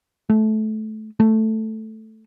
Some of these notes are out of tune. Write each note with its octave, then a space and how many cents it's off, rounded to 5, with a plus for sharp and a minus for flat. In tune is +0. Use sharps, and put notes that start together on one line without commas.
A3 -20
A3 +0